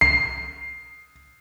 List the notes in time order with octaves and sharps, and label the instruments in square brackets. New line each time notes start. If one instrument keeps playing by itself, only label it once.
[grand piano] C7